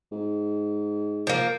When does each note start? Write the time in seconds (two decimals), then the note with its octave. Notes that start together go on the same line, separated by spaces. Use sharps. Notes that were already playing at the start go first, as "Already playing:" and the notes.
0.12 G#2
1.27 F3 A#3